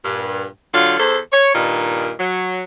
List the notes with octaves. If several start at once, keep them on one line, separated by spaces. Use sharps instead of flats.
G2 A#2
D3 F#3 F4
E2 A4 C5
C#5
G2 A#2 D#3 D#4
F#3